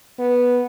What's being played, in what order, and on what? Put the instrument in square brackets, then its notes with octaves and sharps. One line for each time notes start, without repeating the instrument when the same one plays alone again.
[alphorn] B3